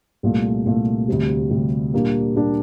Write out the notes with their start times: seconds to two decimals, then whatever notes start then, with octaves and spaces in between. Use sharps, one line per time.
0.23 C2 A#2 A3
0.65 C2 A#2 A3
1.08 D2 C3 G3
1.51 D2 C3 G3
1.94 A#2 G3 A#3 D4
2.36 A#2 G3 A#3 D4